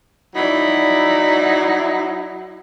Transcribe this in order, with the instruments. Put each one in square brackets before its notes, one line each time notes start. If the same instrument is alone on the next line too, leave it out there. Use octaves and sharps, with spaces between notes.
[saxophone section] F#3 D#4 E4 [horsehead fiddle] D5 B5